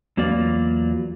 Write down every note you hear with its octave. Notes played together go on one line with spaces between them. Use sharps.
E2 F#3 A#3 F4 D5